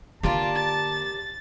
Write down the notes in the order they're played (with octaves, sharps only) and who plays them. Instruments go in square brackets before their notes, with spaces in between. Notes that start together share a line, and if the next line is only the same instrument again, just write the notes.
[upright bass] D3 A#3 [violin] F4 [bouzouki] G4 A#4 D5 [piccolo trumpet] A5
[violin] A6